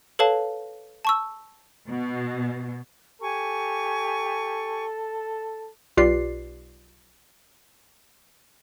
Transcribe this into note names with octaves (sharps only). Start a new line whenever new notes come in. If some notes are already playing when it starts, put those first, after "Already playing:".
A4 B4 C#5 F5 A5
A5 C#6 E6
B2
G4 A4 G#5 C#6
B1 F4 G4 B4 D5 C7